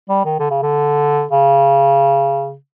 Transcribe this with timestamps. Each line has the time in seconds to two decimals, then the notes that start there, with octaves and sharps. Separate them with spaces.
0.09 G3
0.25 D#3
0.39 D3
0.51 C#3
0.62 D3
1.31 C#3